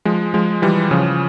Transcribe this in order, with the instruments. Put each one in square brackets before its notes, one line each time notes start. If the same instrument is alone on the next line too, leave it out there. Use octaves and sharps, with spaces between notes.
[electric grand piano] F3 G#3
F3 G#3
E3 G3
C#3 F3